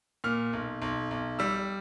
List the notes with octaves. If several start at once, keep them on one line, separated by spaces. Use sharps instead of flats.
A#2 F6
B1
B1
B1
G3 E6